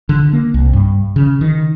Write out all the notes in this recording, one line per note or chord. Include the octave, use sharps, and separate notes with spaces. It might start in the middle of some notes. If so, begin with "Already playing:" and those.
D3
A#3
C2
G2
C#3
D#3